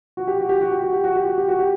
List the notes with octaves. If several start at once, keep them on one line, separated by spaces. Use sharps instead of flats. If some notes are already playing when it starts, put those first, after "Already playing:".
F#4
G4
F#4
G4
F#4
G4
F#4
G4
F#4
G4
F#4
G4
F#4
G4